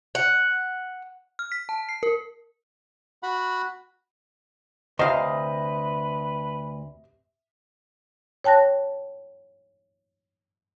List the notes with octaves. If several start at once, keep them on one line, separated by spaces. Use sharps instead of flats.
F#5
F6
B6
A5
C7
A#4
F#4 F#5 B5
D2 C3 B4 D#5 F5
C#5 G5 A5 F#6 A#6